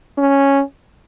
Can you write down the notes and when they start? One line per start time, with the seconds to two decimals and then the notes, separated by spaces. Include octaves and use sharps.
0.18 C#4